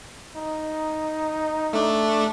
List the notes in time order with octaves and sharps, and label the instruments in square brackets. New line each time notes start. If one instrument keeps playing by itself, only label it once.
[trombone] D#4
[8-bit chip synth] A3 D4